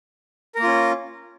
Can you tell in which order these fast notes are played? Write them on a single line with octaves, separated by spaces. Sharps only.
A#4 A#3 F4 C#4